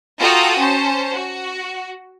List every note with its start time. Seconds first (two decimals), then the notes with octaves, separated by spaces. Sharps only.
0.19 F4 F#4 A4 G5 A#5 D#6
0.58 C#4 C5 A5
1.13 F#4